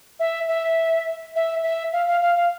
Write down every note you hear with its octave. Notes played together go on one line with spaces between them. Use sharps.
E5
E5
E5
E5
F5
F5
F5
F5